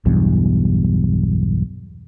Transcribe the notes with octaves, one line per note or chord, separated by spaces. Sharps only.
B1 E2 G2